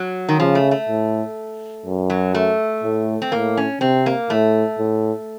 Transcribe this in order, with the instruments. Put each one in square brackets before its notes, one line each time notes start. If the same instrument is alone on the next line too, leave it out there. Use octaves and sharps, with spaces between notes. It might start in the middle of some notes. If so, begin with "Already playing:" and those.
Already playing: [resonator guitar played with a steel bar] F#3
D#3
[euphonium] C#3 [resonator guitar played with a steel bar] F3
[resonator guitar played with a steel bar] A3
A3
[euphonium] A2
F#2
[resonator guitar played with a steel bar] F#3
A3
[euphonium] A2
[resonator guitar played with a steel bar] C4
[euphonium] A2 [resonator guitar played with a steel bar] A#3
[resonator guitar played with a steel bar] C#4
[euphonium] C3 [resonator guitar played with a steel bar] C4
[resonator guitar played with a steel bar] A#3
[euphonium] A2 [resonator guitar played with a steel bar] A3
[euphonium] A2